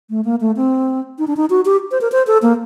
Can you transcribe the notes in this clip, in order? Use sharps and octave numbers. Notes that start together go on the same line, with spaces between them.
A3
A#3
A3
C4
D#4
D4
D#4
F#4
G4
C5
A#4
C5
A4
A#3